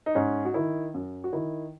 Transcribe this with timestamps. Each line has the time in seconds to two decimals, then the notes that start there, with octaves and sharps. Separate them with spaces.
0.06 D#4
0.15 G#2 C#4
0.45 F#4
0.54 D#3 E4
0.94 F#2
1.24 F#4
1.33 D#3 E4